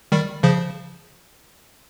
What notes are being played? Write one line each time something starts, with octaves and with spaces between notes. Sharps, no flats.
D#3 G3
C#3 F3